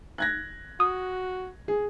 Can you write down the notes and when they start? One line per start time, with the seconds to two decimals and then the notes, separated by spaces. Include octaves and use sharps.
0.18 F#6 G#6 A#6
0.80 F#4 D#6
1.68 G#4